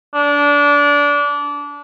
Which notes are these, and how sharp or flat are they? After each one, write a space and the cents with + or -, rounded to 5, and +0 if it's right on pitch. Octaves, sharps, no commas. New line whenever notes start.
D4 -25